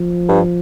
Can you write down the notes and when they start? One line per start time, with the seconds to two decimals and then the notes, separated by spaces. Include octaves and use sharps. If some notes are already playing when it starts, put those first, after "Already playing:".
Already playing: F3
0.29 G2